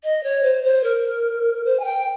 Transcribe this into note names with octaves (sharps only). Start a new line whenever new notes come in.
D#5
C#5
C5
C5
A#4
C5
G#5
G5